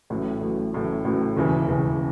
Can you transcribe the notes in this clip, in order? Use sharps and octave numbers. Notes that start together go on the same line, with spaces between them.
A1 A2 F#3
A1 A2 F#3
A1 A2 F#3
A1 A2 F#3
E1 D#2 C#3 E3
E1 D#2 C#3 E3